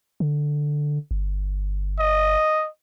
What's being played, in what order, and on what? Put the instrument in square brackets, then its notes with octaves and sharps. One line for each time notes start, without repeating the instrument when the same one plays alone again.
[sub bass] D3
G1
[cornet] D#5